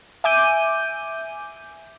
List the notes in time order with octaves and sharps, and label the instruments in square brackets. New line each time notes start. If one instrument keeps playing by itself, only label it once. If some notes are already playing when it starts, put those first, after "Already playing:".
[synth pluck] E5 G#5 D6 G6 D#7